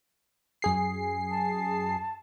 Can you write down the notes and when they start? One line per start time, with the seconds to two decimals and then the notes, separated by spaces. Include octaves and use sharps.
0.62 F#2 G#4 C7
1.30 A5